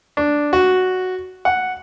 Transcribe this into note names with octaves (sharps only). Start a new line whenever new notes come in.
D4
F#4
F#5